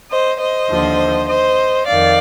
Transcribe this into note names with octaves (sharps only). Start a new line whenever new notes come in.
C5 D#5
C5 D#5
D#2 D3 F3
C5 D#5
F2 D#3 D5 F5